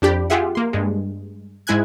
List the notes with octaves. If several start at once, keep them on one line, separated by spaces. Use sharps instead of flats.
F2 D4 G4 B5
F4 G4 G#4 E5 F#5
A#3 C6
G2 G#3
G#2 G#3 E4 G#5 F#6 G#6